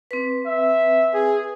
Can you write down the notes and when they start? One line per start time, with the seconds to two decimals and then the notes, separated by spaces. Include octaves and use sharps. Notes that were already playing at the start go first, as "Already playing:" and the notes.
0.11 C4 B4
0.46 E5
1.14 G#4